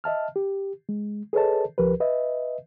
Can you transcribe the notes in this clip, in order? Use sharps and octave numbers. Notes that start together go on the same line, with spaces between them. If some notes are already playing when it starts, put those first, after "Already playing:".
D#5 E5 A5 F6
G4
G#3
G#4 A4 B4 C#5 D#5 A5
C#2 F3 G4 A#4 B4
B4 D#5 E5